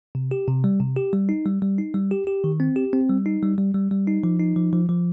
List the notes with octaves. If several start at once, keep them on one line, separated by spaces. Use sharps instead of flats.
C3
G4
C3
G3
C3
G4
G3
D#4
G3
G3
D#4
G3
G4
G4
D#3
C4
G4
C4
G3
D#4
G3
G3
G3
G3
D#4
F3
D#4
F3
F3
F3